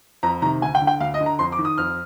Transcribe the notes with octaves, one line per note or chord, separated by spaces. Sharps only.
F2 A#5
C3 D#3 A#5
D2 G#5
G5
D3
G5
D2 F5
D#5
D3
A#5
F2 C6
D6
D#3
D#6
F2 F6